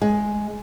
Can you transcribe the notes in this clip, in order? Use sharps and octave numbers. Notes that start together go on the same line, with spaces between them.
G#3